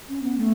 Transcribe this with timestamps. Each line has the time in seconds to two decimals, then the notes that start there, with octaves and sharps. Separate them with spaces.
0.09 C#4
0.22 B3
0.38 A3